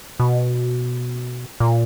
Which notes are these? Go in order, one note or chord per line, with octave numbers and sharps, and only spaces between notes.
B2
A#2